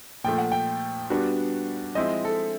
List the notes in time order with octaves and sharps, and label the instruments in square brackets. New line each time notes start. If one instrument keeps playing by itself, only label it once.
[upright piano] A#2 F3 A3 [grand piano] G5
[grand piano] F#5
G5
[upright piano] G3 B3 D4 F#4
[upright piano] F3 G#3 C4 E4 [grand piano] D#5
[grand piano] A4